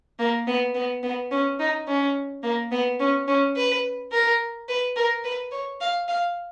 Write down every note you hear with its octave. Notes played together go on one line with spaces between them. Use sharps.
A#3
B3
B3
B3
C#4
D#4
C#4
A#3
B3
C#4
C#4
B4
A#4
B4
A#4
B4
C#5
F5
F5